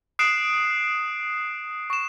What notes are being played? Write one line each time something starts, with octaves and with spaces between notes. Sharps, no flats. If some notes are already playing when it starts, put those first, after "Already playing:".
D#6 F#6 C7 D7 E7
C#6 E7